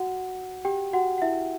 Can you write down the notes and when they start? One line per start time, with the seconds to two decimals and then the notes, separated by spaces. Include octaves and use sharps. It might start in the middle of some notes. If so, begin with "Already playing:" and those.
Already playing: F#4 F#5
0.65 G4 G5
0.93 F#4 F#5
1.18 F#5
1.22 E4 E5